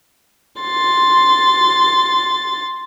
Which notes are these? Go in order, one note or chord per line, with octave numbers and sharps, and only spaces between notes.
C6 A6